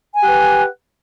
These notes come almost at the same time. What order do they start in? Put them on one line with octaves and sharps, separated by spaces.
G#5 G4 F#5 B4